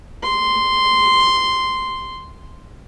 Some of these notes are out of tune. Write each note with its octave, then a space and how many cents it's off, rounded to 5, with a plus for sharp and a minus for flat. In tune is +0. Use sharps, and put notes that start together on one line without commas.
C6 -5